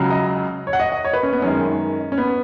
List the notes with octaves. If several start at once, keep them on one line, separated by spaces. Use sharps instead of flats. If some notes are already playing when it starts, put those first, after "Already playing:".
Already playing: C#2 C#3 F#3
D#5
C#5
F#5
D#5
D#5
C#5
B4
C#4
B3
F#2 D#3 G#3 C#4
C#4
B3